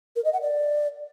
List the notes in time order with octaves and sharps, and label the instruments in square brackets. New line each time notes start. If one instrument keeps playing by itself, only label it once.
[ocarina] A#4
D#5
F#5
D5